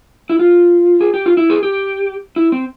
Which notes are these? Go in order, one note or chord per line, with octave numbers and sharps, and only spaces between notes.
E4
F4
G#4
G4
F4
E4
G#4
G4
E4
C4